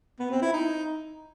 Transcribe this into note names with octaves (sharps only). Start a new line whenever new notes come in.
B3
C4
E4
D#4